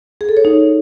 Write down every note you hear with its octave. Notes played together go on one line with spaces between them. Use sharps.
G#4
A4
C#5
D#4